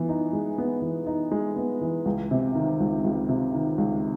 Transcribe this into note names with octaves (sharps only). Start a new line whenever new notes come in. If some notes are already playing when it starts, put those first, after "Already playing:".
Already playing: E3 B3
D#4
G#3
B3
E3
D#4
G#3
B3
E3
C#2
C3
D#3
C#2
C#2
C3
D#3
C#2